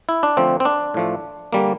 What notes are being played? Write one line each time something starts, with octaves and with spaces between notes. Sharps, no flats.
E4
D4
D3 F3 A3 C4
C4
D4
A2 F3 A3
D3 G3 A#3